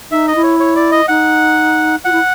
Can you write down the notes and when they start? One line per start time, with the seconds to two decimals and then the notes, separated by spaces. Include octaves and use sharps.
0.11 D#4 E5
0.28 D#5
0.35 E4
0.43 C#5
0.60 C#5
0.76 D5
0.91 D#5
1.08 D#4 F#5
2.05 F4 F#5
2.12 E4